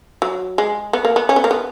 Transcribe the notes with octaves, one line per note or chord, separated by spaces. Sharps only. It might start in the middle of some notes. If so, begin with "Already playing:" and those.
F#3
G#3
B3
A#3
B3
C#4
B3
A#3
B3